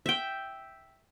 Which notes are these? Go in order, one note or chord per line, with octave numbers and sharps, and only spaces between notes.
E5 G5